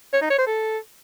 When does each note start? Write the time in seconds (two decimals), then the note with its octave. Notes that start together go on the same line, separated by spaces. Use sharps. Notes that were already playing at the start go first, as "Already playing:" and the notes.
0.13 C#5
0.21 D#4
0.30 C#5
0.38 C5
0.46 A4